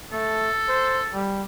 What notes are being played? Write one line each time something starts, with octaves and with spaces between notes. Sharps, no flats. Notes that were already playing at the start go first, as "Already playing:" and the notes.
A3 A4
C5
G3